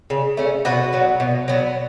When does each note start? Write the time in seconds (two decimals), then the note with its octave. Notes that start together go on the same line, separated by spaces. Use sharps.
0.10 C#3
0.37 A3 C#4
0.65 B2 F#4 B4
0.93 F#3 B3
1.20 B2
1.48 F#3 B3